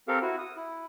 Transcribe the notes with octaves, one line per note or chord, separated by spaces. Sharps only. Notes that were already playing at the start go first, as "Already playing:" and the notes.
C4 G4 A4 A#4 F5
E4 F#4
D#6
E4